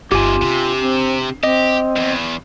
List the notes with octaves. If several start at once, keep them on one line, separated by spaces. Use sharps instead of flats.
G1 G#2 C3 F4 G4 G#5
C3 D4
C4
C4 G4 D#5
E2 G2